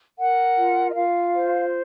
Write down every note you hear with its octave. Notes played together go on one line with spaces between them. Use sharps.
A#4 F#5
F4
D#5
F4 F5
C5